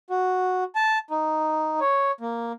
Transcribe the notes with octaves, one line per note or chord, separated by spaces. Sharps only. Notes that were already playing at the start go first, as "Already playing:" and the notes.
F#4
A5
D#4
C#5
A#3